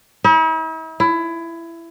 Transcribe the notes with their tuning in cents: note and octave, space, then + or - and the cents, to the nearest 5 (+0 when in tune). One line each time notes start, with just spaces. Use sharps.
E4 -45
E4 +20